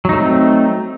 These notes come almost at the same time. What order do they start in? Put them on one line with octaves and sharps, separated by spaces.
F#3 D#4 A3 C4